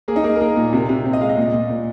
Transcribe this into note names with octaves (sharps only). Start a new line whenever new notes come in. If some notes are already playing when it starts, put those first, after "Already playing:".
A#3 G#4
D#4
A#3 G#4
A#4
A#3 G#4
A#2
C3
C3
C4
D#5
G#3 F5
D#5
A#2
A#2
A#2